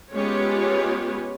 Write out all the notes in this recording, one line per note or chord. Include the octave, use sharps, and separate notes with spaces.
G#3 B3 C#4 F4 G4 C#5